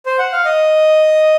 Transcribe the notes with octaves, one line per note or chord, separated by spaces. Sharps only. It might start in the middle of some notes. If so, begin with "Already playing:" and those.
C5
F#5
F5
D#5